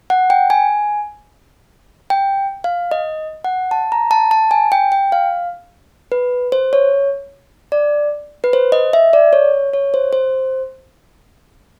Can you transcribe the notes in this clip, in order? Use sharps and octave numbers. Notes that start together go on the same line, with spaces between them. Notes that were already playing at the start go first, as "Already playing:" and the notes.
F#5
G5
G#5
G5
F5
D#5
F#5
A5
A#5
A5
A5
G#5
G5
G5
F5
B4
C5
C#5
D5
B4
C5
D#5
E5
D5
C#5
C#5
C5
C5